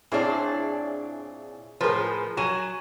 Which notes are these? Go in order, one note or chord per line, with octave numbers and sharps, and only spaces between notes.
A#2 C4 D4 E4 G#4 C#5
A2 F3 G#4 A#4 B4
F#3 G#5 E7